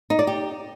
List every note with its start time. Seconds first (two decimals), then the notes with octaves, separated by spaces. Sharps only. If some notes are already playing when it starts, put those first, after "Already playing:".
0.10 D#4
0.19 D5
0.27 G4